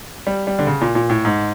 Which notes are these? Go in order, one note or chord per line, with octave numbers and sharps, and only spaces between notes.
G3
G3
D3
C#3
A#2
A#2
A2
G#2